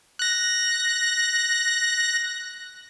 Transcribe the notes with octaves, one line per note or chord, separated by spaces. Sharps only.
F#6 A#6